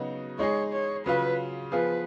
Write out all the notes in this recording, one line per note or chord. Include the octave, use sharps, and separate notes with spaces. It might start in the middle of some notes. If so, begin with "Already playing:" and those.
Already playing: C#3 F#3 B3 D#4 F#4
G#3 D#4 G#4 C#5
C#5
C#3 F#3 C#4 F4 B4
F3 B3 F4 G#4 B4